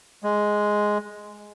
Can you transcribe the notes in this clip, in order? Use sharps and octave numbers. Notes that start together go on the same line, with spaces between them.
G#3